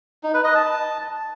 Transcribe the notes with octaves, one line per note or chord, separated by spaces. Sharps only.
D#4
B4
D#5
A5